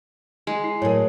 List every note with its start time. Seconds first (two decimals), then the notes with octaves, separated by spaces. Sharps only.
0.47 G#3
0.64 E4 C7
0.82 A2 F#3 G#4 A#4 C#5